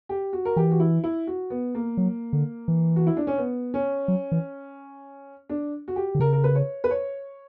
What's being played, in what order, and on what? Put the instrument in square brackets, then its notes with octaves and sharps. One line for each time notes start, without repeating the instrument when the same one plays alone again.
[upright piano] G4
F#4
A#4
[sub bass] E3 [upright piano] G4
[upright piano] F#4
E4
E4
F#4
B3
A#3
[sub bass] F#3
D3
E3
[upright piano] F#4
E4
D4
C#4
B3
C#4
[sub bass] F#3
E3
[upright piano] D4
F#4
G4
[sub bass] D3
[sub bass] C#3 [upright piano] A#4
[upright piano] A#4
B4
C#5
B4
C#5